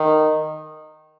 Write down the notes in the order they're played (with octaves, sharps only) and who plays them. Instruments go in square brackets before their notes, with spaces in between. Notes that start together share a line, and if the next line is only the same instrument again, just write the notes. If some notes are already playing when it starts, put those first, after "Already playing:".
Already playing: [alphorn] D#3